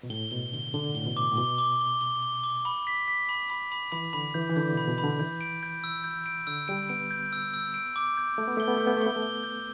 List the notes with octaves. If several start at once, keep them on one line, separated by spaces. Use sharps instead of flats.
B2
A2 G7
B2 G7
D3 G7
D3 G7
A2 G7
B2
D6
A2
B2 G7
D6
G7
G7
G7
D6
B5
B6
B6
B5
B5
B5
E3 B5
D3 B5
E3 G6
E3
D3 G6
B2
B5
B2
B5
D3
E3 G6
D7
G6
E6
G6
D7
D3 E6
G3 D7
B3 D7
G6
E6
E6
D7
D6
G6
A3 G6
B3
A3 G7
B3
A3 G6
B3
A3
B3 G7
A3
G7
G6